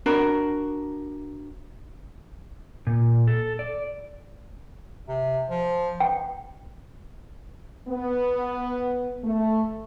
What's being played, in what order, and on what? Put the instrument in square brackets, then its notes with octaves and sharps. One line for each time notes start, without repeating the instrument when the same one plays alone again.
[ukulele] D4 F#4 A#4 B5
[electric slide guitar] A#2
A4
D5
[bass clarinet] C3
F3
[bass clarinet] E3 [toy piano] G5
[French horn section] B3
A3